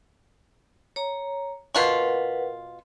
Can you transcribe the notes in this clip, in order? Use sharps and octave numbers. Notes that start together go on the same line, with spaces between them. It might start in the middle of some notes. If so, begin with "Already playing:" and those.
C#5 A#5
B2 F4 A#4 B4 F#5 C#6